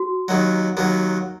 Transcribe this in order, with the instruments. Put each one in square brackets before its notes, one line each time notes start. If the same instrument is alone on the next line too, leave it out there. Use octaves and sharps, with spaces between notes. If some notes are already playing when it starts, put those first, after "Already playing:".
Already playing: [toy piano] F#4
[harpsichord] D#2 D#3 F#3
D#2 D#3 F#3